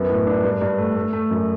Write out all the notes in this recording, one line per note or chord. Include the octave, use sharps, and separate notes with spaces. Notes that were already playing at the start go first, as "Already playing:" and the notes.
Already playing: F#2 B3
A2
D4
G2
G2
A3
A3
A3
F#2